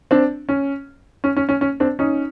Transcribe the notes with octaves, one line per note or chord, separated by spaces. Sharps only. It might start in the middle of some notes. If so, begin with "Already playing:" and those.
C4 D4
C#4
C#4
C#4
C#4
C#4
C4 D4
C#4 D#4